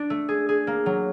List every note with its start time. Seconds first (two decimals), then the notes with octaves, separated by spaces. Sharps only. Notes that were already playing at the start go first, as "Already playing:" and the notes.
Already playing: D4
0.10 A3
0.29 G#4
0.49 G#4
0.67 A#3
0.86 F#3